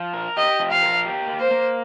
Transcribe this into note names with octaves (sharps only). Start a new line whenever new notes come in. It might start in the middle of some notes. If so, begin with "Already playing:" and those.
Already playing: F3
A#4
G4 D#5
F3
F5
A#4
G4
A#3
C5
A#3